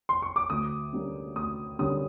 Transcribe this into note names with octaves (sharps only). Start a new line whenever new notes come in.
C6
C#6
D6
D2 D#6
D3 G3 A#3 C#4
D2 D#6
D3 G3 A#3 C#4 D#6